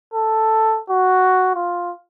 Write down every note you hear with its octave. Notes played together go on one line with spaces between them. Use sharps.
A4
F#4
F4